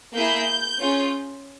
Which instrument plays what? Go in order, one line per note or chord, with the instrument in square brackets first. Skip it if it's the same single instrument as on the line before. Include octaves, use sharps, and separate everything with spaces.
[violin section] A#3 E4 G#4 G6
C#4 F4 G#4